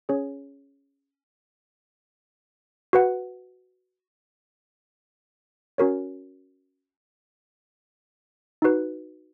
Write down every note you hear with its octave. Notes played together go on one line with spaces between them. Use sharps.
C#4 G#4 C#5
F#4 B4 F#5
C#4 F#4 A#4 C#5
D#4 F#4 B4